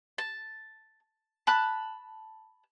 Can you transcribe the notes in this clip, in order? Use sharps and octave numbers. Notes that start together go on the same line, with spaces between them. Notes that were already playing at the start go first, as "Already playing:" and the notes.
A5
A5 B5 F#6